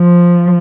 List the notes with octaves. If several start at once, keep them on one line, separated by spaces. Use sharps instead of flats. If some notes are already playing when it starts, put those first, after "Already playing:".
Already playing: F3